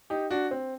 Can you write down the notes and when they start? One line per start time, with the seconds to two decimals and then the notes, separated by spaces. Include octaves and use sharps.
0.10 D#4 G4
0.31 D4 F#4
0.51 C4